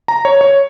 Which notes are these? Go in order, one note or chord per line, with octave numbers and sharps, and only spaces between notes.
A#5
C#5
C#5